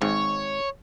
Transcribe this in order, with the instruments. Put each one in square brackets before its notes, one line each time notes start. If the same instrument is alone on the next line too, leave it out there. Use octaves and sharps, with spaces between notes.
[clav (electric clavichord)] G#1 G#2 [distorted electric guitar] C#5